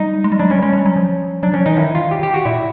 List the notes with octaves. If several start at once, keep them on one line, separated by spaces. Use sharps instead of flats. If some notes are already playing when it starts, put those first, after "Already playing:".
Already playing: G3 D#4
G#3
G3
F#3 D4
G3 C#4
G#3 C#4
G3
F#3
F3
F#3 D4
F3 C#4
E3 D#4
D#3 E4
F4
G4
G4
F#4
A#2 E4